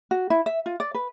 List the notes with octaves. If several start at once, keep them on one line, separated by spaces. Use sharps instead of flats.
F#4
E4
E5
F4
D5
B4